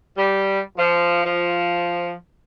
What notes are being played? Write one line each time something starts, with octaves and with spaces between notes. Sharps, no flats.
G3
F3
F3